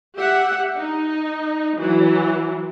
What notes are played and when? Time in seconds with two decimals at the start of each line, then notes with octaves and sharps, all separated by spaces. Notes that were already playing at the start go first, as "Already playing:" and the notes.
0.18 G4 E5 F#5
0.79 D#4
1.80 E3 F#3